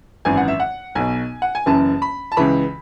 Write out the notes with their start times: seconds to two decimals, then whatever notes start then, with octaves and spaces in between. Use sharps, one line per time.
0.25 G#1 F#2 E3 G#5
0.37 F#5
0.48 E5
0.60 F#5
0.95 B1 B2 G#5
1.42 F#5
1.55 G#5
1.66 F#1 F#2 C#3 E3 A5
2.02 B5
2.32 A5
2.37 C#2 C#3 E3 B5